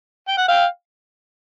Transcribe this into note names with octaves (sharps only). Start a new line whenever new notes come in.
G5
F#5
F5 G5